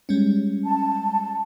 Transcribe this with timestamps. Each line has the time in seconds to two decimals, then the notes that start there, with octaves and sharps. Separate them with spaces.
0.09 G3 G#3 C#4
0.65 A5